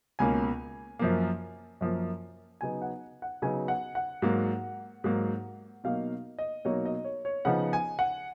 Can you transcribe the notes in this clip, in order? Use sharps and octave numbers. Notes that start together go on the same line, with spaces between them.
C#2 B2 A#3 C#4 G#5
F#2 F3 A#3
F#2 F3 A#3
C#3 F#3 B3 D#4 G#5
F#5
F#5
C#3 F#3 B3 D#4 G#5
F#5
F#5
G#2 F#3 A#3
G#2 F#3 A#3
B2 F#3 A#3 D#4 F5
D#5
B2 F#3 A#3 D#4 C#5
D#5
C#5
C#5
C#3 F3 B3 D#4 F#5
G#5
F#5